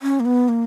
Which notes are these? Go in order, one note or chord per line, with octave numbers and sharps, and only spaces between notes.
C#4
A#3
B3
A#3